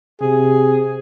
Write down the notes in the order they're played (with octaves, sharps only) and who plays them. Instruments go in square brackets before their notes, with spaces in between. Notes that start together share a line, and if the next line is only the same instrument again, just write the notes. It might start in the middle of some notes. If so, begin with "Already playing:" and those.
[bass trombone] C3 [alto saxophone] G#4